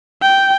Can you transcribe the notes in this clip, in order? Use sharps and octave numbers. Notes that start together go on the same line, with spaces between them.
G5